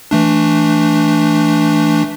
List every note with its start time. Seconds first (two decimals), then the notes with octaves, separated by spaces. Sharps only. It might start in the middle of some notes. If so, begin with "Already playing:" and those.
0.11 E3 A3 D4